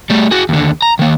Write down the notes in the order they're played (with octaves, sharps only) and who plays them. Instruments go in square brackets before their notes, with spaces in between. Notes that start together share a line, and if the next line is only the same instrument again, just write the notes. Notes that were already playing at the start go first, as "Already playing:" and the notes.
[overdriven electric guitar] G3 A3
F#4 G#4
D#2 D3
A#5
D#3 A#3